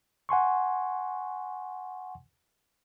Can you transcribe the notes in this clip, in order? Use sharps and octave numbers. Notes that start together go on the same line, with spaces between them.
F#5 G#5 C6 C#6